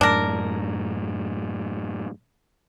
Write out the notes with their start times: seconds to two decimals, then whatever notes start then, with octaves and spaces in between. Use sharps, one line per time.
0.01 F#2 A2 D4 A#4